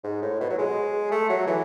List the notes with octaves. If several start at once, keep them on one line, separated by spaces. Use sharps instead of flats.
G#2
A2
B2
F#3
G#3
A3
F#3
E3